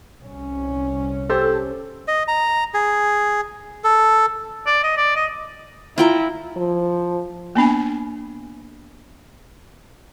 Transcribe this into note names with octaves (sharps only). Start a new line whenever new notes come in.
C2 C#4
G4 A4 C5
D#5
A#5
G#4
A4
D5
D#5
D5
D#5
E4 F4 G5 A#5
F3
A#3 B3 D4 G#5